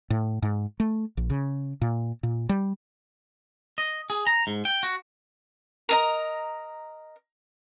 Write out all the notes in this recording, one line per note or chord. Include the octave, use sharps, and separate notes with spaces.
A2
G#2
A3
A#1
C#3
A#2
A#2
G3
D#5
G#4
A#5
G#2
G5
F#4
A#4 D#5 A#5